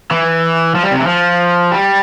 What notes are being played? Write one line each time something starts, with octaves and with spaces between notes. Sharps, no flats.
E3
F3
G3
C3
E3
F3
G3